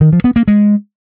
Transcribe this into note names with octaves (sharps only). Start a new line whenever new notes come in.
D#3
F3
B3
A#3
G#3